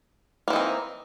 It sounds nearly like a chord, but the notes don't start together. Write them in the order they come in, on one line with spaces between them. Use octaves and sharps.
A#3 E3 D#4 C4